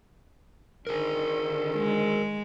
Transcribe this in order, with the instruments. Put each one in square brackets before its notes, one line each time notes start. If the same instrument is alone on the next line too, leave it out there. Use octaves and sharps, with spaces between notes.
[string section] D3 D#3 [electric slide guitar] G#4 A#4
[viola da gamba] G#3